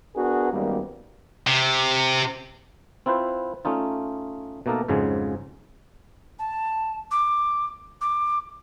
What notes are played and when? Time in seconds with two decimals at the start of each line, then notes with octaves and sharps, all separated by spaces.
0.16 B3 D4 F#4 G#4 A#4
0.51 G#1 F#2 G3 A#3 B3
1.47 C3
3.06 C4 E4 F4 B4 C5
3.65 A3 C#4 D#4 F4
4.66 B2 A3 A#3 D#4 A4 A#4
4.88 F2 G#2 C#3 F#3 G#3
6.38 A5
7.10 D6
8.01 D6